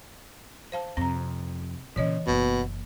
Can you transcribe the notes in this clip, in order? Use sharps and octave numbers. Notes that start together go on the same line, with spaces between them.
C5 F5 A5
F2 C3 C4 A#5
A#2 C#3 E3 C#5 D#5
F#1 B2 A#3